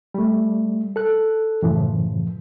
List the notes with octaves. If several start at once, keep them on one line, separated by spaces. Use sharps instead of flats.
G3 A3
A4 F#6
F#2 A2 C#3 E3 F3